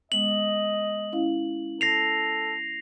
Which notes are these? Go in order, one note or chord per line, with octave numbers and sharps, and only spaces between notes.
G#3 B3 D#5 F#7
C#4 E4 F5
A4 A#6 C7 F7